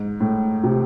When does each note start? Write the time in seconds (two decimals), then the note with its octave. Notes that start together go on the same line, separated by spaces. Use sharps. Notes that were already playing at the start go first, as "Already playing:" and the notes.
Already playing: G#2
0.20 A2
0.64 C3